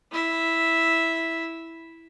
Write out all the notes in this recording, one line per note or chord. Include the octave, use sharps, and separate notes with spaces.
E4 E5